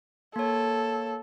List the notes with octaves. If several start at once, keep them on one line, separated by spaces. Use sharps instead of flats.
A#3 A4 C#5